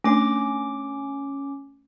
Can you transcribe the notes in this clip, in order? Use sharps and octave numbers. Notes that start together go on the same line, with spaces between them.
A3 C#4 D4 D6